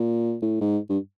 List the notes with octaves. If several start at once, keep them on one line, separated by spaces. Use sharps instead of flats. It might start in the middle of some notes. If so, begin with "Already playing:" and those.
Already playing: A#2
A2
G#2
G2